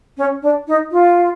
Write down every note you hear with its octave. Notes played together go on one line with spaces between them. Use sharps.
C#4
D4
D#4
F4